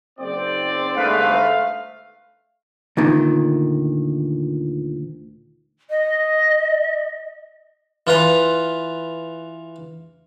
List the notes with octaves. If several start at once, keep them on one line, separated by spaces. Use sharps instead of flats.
F#1 C4 D5
G1 G#2 A3 B4 F5
D2 A#2 D#3
D#5
E3 F4 B4 A#5